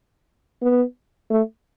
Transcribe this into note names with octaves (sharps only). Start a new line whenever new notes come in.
B3
A3